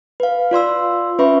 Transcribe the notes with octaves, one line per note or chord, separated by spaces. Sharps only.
B4 F5
F4 D5 C6 E6
C#4 B4 E5 B5 C#6